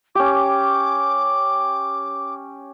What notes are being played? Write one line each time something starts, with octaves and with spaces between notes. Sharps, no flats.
C#4 G4 D6